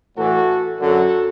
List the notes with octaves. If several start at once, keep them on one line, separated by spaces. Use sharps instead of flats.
A2 E3 F#4 A4
F#2 D3 F#3 F#4 A4